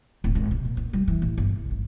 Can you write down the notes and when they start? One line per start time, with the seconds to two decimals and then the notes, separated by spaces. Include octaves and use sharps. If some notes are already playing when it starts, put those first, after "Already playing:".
0.24 D1
0.35 G#1
0.51 C3
0.65 A#2
0.77 B3
0.93 G3
1.08 E3
1.22 A1
1.38 G1
1.56 C2
1.71 G#1